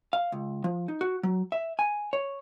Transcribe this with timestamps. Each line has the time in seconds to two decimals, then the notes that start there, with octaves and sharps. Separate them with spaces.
0.13 F5
0.32 C#2
0.64 F3
0.88 D#4
1.01 F#4
1.23 F#3
1.52 E5
1.79 G#5
2.13 C#5